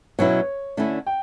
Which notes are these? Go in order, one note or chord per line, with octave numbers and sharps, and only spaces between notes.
B2 F#3 C#4 E4 C#5
D3 A3 C#4 E4
G5